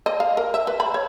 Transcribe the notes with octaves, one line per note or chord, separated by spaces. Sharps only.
D#5
F5
A#4
E5
B4
B5
C#5